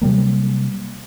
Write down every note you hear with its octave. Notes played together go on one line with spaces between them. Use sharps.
C3 F#3 G3 A#3